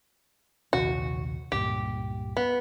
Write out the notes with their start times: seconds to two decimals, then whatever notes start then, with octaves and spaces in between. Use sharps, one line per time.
0.73 A#1 D#2 C3 F#4
1.52 C#2 G2 A#2 G4
2.37 B3